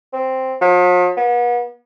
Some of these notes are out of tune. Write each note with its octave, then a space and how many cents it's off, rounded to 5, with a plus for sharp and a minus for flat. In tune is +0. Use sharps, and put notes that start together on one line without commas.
C4 +0
F3 +45
B3 -40